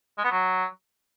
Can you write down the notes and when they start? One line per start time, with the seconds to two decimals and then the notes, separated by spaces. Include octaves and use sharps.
0.18 G#3
0.24 B3
0.31 F#3